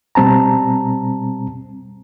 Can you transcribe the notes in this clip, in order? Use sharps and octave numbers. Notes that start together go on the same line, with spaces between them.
B2 G3 C4 A5 A#5